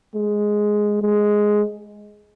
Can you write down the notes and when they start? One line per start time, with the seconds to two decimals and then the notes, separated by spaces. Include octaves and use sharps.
0.14 G#3
1.01 G#3